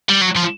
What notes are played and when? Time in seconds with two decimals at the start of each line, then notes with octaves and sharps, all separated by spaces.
0.09 G3
0.21 F#3
0.36 F3